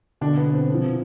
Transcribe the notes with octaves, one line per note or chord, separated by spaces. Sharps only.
B2 D3 D4
B3
C4
C3 F3 C4